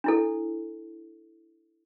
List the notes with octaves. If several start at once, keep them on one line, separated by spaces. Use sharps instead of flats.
D4 E4 A4